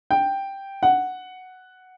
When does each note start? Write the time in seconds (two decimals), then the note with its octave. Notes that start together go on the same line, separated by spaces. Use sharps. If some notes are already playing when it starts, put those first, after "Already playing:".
0.11 G5
0.83 F#5